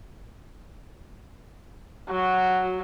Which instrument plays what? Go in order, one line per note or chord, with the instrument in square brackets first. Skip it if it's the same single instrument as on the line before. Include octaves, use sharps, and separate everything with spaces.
[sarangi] F#3 [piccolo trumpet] F#4